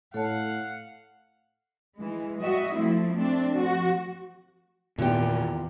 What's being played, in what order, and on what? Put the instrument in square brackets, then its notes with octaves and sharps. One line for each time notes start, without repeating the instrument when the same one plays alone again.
[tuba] A2 [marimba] A4 C#5 A5 [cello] F5 [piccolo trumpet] F#5
[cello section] E3 G#3
G3 F#4 D#5 E5
F3 A3 C4 E4
A3 C4 D4
F3 F#4
[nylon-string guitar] E2 G4 [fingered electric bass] A#2 B3 [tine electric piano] D#3 F4